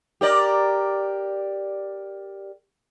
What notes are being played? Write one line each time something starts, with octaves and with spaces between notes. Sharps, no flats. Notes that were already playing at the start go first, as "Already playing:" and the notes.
G4 A#4 D5